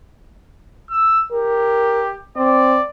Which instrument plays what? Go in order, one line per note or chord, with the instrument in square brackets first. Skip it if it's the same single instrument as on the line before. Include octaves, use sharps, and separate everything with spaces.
[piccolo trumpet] E6
[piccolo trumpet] G4 [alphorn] A#4
[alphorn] C4 [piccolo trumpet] D5